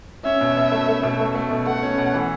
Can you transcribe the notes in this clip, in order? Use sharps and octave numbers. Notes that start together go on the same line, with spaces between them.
C#4 E5
B2
B2
A3
A3
B2
A3
A3
B2
A3 F#5
C#4
B2
E3